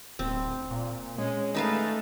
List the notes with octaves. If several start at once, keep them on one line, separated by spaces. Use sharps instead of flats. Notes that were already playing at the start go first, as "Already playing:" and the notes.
D1 C4
A#2
G#3 C#4
A3 D#4 B4 F5